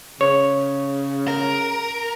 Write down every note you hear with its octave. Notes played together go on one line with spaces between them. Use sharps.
C#3 C#5
A#4